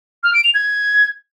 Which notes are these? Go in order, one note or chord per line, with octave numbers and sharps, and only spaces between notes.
F6
D7
F7
G#6